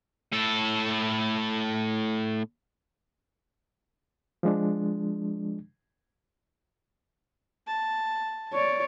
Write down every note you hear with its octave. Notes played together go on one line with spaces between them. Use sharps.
A2 A4
F3 G#3 D4
A5
C#5 D5